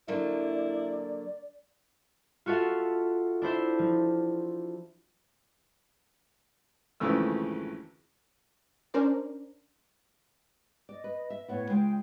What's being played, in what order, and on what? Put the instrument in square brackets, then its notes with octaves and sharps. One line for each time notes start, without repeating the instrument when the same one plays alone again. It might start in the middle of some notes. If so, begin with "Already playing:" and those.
[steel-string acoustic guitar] D3 F#3 A#3 [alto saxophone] E4 [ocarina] D5
[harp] F4 F#4 A4 E5 F5
D4 E4 C5 E5
F3
[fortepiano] G#1 F2 C#3 E3 A3 E6
[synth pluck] C#4 D4 A#4 C5 D5
[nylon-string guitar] D5 [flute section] D#5
[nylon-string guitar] B4
E5
[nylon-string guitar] A2 B3 E4 [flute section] B4 C#5 F#5
[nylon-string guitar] C#3 G#3 F4 [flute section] G5